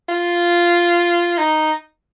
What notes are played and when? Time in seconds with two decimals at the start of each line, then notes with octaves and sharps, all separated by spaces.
0.09 F4
1.38 D#4